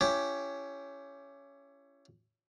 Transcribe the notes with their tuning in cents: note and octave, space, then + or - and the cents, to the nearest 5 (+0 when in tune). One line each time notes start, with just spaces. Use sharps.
C#4 +10 E4 +30 G4 +0